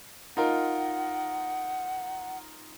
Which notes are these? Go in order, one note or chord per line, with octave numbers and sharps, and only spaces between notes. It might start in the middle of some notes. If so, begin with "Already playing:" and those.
D#4 F4 A#4 F#5